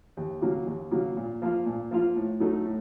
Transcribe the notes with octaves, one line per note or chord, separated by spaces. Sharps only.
D#2
C#3 F#3 A#3
D#2
C#3 F#3 A#3
A#2
F3 A#3 F4
A#2
F3 A#3 F4
A2
F#3 A3 D#4
A2